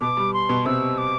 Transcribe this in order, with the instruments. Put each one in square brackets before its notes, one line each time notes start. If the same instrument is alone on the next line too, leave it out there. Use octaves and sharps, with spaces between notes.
[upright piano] B2 B3 [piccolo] D6
[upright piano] G3
[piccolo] C6
[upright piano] B2 B3
[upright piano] C3 C4 [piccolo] E6
[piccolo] D6